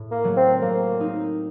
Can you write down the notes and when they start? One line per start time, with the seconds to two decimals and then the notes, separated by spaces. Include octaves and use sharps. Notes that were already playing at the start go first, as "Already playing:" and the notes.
Already playing: A2
0.11 A#3
0.24 F#3 A3
0.37 C4
0.62 F#3 A#3
1.00 C4 D#4